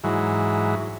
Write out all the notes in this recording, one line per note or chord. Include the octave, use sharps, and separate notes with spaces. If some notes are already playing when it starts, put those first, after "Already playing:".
G#2 E3 F#3